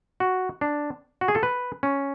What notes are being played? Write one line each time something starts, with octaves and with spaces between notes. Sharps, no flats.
F#4
D4
F#4
G#4
A4
B4
C#4